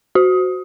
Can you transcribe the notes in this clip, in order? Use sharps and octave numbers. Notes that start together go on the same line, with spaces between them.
F#4